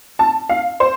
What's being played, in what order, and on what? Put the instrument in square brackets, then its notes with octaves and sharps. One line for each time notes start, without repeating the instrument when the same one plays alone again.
[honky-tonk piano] A5
F5
C5